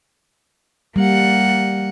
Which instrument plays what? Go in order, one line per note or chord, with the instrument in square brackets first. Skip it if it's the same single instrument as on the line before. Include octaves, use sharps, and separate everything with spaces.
[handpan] G3 [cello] A#3 F#5